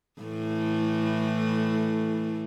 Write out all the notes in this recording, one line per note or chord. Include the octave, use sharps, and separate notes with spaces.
A2 E3 A3